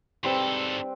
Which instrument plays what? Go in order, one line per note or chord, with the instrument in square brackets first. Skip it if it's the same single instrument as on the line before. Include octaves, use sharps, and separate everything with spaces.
[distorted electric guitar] G#2 A4 [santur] G3 C4 B4